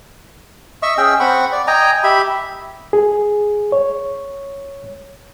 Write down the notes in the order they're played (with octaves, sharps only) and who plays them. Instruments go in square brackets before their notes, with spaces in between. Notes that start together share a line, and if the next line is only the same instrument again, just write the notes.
[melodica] D#5 E5 C#6 E6
C#4 G#4 G5 E6
C4 F#5 B5 C#6
D5
D#5 G5 G#5 A#5
G4 E5 B5
[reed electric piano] G#4
C#5